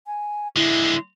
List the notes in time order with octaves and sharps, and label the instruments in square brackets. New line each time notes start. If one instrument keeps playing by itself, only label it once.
[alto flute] G#5
[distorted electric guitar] D3 G#3 [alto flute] E4